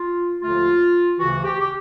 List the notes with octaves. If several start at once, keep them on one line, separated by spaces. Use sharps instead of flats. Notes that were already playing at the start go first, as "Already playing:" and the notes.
Already playing: F4
D#2 D3 F3 A3 F4
D2 C#3 E3 F#4
G4
G4